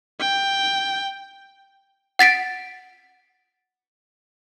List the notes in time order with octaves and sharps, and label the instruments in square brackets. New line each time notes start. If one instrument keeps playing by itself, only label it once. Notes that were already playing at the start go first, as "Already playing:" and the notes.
[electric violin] G5
[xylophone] F#5 A6 B6 D7